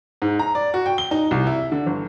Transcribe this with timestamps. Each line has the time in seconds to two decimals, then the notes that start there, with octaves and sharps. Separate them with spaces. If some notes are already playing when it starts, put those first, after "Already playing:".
0.22 G#2
0.39 A#5
0.55 D5
0.74 F#4
0.86 G5
0.98 G7
1.11 D#4
1.31 C2
1.47 E4
1.72 D3
1.86 G1